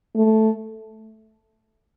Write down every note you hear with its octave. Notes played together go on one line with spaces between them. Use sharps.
A3